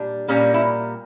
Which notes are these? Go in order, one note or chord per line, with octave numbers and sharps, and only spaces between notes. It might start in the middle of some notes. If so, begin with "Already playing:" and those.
Already playing: A#2 G3 D4
A#2 G3 A#3 C#4
E4